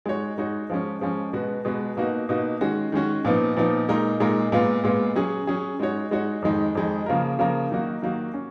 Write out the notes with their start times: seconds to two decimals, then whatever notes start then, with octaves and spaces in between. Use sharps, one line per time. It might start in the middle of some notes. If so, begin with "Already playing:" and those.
0.06 G#3 D#4 F#4 C#5
0.38 G#3 D#4 F#4 C#5
0.70 F3 G#3 C#4
1.01 F3 G#3 C#4
1.33 B2 G#3 B3 F#4
1.65 B2 G#3 B3 F#4
1.97 B2 A#3 D#4 F#4
2.29 B2 A#3 D#4 F#4
2.61 D#3 G#3 C#4 F#4
2.92 D#3 G#3 C#4 F#4
3.25 A#2 F3 B3 D#4
3.56 A#2 F3 B3 D#4
3.88 A#2 G#3 D#4 A#4
4.20 A#2 G#3 D#4 A#4
4.52 A#2 G#3 B3 F4
4.84 A#2 G#3 B3 F4
5.16 F#3 C#4 G#4
5.47 F#3 C#4 G#4
5.80 G#3 D#4 F#4 C#5
6.11 G#3 D#4 F#4 C#5
6.42 F2 D#3 G#3 D#4
6.75 F2 D#3 G#3 D#4
7.06 C#3 F3 A#3 F4 A#4
7.39 C#3 F3 A#3 F4 A#4
7.70 D#3 F#3 A#3 D#4 F#4
8.02 D#3 F#3 A#3 D#4 F#4
8.34 C#4